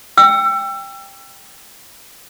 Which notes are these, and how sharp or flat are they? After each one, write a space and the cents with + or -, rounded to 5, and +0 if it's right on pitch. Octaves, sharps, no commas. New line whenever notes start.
G5 +15 E6 +30